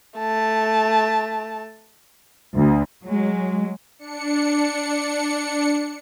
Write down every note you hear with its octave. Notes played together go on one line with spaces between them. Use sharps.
A3 A5
D2
F#3 G#3
D4 C#7